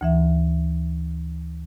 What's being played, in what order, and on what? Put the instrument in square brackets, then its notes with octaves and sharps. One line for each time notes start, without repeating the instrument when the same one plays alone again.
[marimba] D2 E3 E5